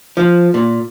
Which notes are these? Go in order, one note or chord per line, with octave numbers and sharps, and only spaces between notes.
F3
A#2